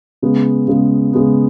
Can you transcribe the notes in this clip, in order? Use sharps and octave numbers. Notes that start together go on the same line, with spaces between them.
C#3 G#3 B3
C#3 G#3 B3
C#3 G#3 B3